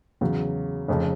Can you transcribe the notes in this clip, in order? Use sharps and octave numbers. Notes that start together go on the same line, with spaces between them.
E2 C#3 F#3
F1 F2 C#3